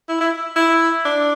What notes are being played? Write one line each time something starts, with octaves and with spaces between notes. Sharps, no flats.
E4
E4
E4
D4